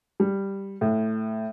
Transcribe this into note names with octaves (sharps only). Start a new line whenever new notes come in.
G3
A2